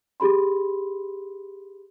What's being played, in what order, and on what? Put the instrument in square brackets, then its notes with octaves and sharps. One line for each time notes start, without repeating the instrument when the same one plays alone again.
[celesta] G4 G#4 B5 C6